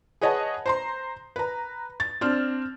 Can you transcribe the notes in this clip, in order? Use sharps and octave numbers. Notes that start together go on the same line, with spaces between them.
G#4 B4 C#5 D#5 F#5 A5
C5 A#5 C6
B4 A#5
A6
C4 D4 F6